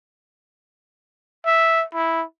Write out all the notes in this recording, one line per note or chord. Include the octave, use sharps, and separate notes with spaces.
E5
E4